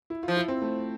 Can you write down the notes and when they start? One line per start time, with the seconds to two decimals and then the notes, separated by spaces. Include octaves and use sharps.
0.10 E4
0.23 F4
0.28 F3
0.37 E4
0.48 C4
0.62 A3